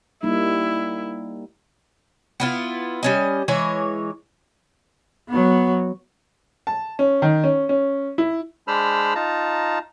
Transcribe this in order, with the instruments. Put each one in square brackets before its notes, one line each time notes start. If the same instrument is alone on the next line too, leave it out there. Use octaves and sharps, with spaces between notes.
[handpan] G3 A#3 D#4 [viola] E4
[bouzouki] B3 E4 F4
G3 C#4 D#5
E3 G#3 C#5
[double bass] F#3 B3
[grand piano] A5
C#4
D#3
C#4
C#4
E4
[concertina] G#3 D4 C5 B5 E6 F6
D#4 F4 A5 A#5